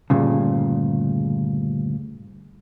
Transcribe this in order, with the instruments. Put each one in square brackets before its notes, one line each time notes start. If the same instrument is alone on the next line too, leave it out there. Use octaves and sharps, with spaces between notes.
[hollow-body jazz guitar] D2 G2 A#2 C#3